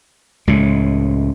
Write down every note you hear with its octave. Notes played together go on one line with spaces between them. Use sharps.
C#2 A2